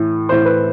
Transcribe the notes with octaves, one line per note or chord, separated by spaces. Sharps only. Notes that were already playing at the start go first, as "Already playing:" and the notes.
Already playing: A2 E3
A2 E3 C5
B4